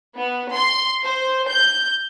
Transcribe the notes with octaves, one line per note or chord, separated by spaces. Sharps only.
B3
C6
C5
G6